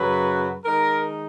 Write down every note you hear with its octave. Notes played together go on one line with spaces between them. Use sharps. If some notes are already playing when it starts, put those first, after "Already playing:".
Already playing: F#2 C#3 F#3 B4
D#3 G#3 D#4 A#4